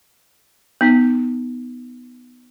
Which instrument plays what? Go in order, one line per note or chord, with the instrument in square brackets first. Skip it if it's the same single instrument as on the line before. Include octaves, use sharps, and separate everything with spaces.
[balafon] B3 D#4